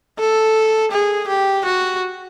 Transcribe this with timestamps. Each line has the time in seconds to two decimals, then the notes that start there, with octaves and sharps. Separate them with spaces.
0.19 A4
0.91 G#4
1.28 G4
1.65 F#4